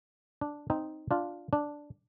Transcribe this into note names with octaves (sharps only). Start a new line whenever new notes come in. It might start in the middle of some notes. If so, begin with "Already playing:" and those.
D4
C4 D#4
D4 F4
D4